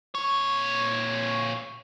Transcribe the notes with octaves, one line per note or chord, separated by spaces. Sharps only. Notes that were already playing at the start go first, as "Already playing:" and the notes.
A#2 C#5